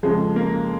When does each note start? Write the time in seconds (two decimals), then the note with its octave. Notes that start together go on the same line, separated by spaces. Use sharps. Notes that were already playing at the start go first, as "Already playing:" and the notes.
0.03 F2 C#3 F3 G#3
0.36 A#3